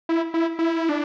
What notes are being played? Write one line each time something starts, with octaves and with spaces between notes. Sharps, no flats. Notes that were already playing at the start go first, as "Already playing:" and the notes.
E4
E4
E4
D4